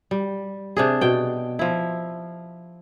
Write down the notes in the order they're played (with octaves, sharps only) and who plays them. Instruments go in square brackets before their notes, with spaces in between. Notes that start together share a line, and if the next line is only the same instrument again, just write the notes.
[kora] G3
C3 D4 G#4
B2 G5
F3 E4